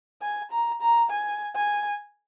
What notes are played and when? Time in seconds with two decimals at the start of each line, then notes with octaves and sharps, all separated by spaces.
0.22 G#5
0.51 A#5
0.81 A#5
1.10 G#5
1.55 G#5